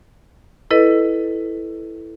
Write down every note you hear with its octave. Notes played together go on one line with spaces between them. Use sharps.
E4 A4 B4 D#5